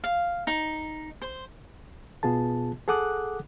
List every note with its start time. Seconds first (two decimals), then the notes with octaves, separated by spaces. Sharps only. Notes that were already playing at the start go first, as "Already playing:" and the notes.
0.04 F5
0.47 D#4
1.22 C5
2.23 B2 B3 F4 G#4 A5
2.88 G#4 A4 F#5 D6 D#6 F#6